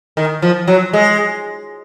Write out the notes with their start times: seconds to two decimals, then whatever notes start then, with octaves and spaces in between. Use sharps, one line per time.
0.17 D#3
0.42 F3
0.68 F#3
0.93 G#3